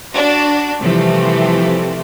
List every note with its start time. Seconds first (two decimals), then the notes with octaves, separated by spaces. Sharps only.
0.12 D4 F#4
0.80 C3 E3 F3 G3 A3 C4